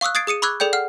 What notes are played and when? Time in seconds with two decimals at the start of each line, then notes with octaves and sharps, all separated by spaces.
0.01 F5 C#6 D#6 E6 F#6
0.15 D#6 G#6 A6 C7 D7
0.27 G#4 D#6 C#7 D#7
0.42 B5 C#6 D6 E6 F#6 G#6
0.60 G#4 A4 D5 G5 G6
0.73 F#5 F6